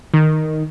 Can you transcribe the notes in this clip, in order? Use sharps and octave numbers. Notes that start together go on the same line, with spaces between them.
D#3